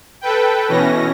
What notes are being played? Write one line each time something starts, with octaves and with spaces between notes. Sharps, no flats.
A4 B4 G5
B2 E3 C#4 A#6